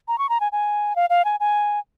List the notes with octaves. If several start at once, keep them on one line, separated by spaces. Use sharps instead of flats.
A#5
C#6
A#5
G#5
G#5
F5
F5
G#5
G#5